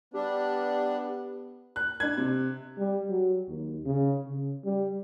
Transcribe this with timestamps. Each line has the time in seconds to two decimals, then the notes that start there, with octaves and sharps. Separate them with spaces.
0.14 G3 B3 D4 G4
1.76 F#6
2.00 D4 G#6
2.17 C3
2.78 G3
3.10 F#3
3.48 D#2
3.86 C#3
4.27 C#3
4.65 G3